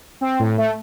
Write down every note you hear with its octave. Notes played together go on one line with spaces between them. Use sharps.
C4
A2
A3